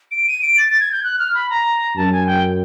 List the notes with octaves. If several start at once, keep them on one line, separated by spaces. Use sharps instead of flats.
D7
D#7
D7
A6
A6
G#6
G6
F#6
F6
B5
A#5
F#2 A5
G#5
G5